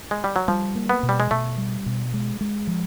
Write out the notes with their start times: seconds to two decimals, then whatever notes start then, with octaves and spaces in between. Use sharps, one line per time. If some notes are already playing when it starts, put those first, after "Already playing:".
0.11 G#3
0.24 G3
0.36 F#3
0.48 F3 G3
0.75 A#3
0.89 B3
1.03 B2
1.09 G3
1.20 G#3
1.31 B2 A3
1.58 G3
1.86 B2
2.14 G#3
2.41 G#3
2.67 F3